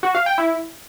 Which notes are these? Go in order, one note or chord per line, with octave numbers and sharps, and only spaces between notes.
F#4
F5
G5
E4